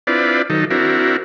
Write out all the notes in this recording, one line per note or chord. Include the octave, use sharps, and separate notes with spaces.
C4 D4 E4 F4 B4 D5
D#3 F#3 D#4 A4
C4 D4 E4 F#4 A#4